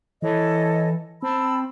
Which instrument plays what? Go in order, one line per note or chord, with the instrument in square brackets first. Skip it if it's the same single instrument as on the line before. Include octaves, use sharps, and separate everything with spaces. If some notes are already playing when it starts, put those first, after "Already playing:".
[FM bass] E3 [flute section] A4 C#5 D#5
[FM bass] C4 [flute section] A5 B5 E6